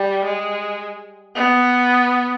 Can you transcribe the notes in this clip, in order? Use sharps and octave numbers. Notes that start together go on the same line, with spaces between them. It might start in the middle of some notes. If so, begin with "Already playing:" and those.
Already playing: G3
G#3
B3